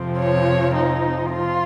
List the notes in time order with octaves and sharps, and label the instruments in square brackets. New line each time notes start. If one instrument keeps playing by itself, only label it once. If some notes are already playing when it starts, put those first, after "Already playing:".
Already playing: [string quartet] F2 C3 F3 C4
C#5
D#4
F4